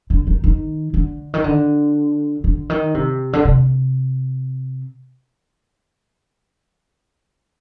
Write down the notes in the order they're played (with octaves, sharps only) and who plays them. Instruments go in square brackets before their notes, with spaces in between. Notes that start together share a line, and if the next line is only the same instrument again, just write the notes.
[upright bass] D3
D#3
D#3
D3
D#3
D3
D3
D#3
C3
D3
C3